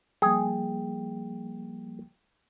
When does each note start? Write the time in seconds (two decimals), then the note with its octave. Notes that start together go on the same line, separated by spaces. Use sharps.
0.22 F3 G3 A#3 G#4 G5